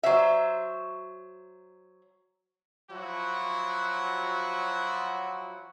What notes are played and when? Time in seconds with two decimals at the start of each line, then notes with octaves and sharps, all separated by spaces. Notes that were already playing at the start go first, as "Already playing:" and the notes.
0.03 F#3 C5 E5
2.90 F3 F#3 E4 F#4